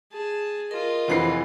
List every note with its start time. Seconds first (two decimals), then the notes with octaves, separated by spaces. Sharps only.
0.12 G#4 A5
0.71 F4 A#4 D#5
1.08 F1 E3 C5 F#5 B5 C7